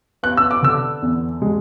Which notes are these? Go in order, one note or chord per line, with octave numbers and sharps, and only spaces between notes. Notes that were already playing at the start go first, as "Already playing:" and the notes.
B3 F#6
E6
D6
D3 E6
E2
G#3